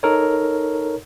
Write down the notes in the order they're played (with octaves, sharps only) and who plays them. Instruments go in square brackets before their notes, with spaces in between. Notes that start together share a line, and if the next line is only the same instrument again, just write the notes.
[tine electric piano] D#4 A4 A#4 C#5